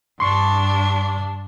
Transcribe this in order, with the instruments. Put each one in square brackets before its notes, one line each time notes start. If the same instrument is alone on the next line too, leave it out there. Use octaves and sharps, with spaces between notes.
[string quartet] G2 D4 [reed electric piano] C6 C#6